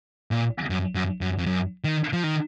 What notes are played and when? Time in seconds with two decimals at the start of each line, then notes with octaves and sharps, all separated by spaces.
0.31 A#2
0.70 F#2
0.95 F#2
1.21 F#2
1.38 F2
1.46 F#2
1.84 D#3
2.13 F3
2.24 D#3